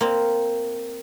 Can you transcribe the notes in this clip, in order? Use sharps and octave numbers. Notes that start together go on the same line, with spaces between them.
A#3 C4